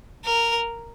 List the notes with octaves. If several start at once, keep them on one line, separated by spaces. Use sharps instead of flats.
A#4